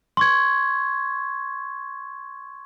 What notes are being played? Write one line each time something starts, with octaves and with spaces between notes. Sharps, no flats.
C6 C#6 G#6